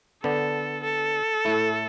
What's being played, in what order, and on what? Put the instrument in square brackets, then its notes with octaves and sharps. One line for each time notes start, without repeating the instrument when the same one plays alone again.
[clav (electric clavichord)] D3 B3 D4 [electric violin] A4
[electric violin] A4
[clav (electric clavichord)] A2 A3 E4